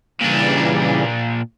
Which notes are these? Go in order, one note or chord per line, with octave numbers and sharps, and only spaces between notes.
A#2 C#3 E3 G3 D4